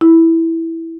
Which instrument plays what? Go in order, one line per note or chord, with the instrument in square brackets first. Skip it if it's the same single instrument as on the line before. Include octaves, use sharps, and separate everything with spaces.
[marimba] E4